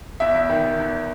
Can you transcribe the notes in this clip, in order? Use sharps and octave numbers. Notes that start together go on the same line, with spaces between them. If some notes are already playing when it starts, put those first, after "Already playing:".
E2 E5
E2
D#3
D#3
E2